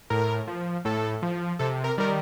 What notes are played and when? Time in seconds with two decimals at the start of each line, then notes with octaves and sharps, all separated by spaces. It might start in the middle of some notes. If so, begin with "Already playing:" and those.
0.10 A2 A#4
0.47 F3
0.85 A2 A4
1.22 F3
1.59 C3 A4
1.84 A#4
1.98 D#3 G3 A#4